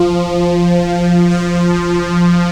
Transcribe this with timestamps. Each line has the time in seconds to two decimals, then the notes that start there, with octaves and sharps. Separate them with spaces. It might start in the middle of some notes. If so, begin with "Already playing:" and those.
Already playing: F3
1.31 F3